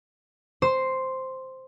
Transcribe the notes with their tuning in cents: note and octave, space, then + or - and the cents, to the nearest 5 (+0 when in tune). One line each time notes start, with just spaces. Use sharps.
C5 +0 C6 +0